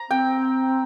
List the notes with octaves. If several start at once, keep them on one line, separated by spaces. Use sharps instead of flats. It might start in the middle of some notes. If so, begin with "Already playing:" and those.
Already playing: A#5
C4 G5